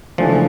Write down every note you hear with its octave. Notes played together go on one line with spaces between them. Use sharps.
C#3 E3 F3 A3 D4